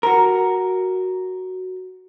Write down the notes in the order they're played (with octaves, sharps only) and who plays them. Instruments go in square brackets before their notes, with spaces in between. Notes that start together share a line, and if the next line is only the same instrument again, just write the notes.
[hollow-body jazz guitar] F#4 A#4